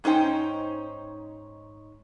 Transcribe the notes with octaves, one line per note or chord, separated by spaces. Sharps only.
G#2 C#4 D#4 C5 G5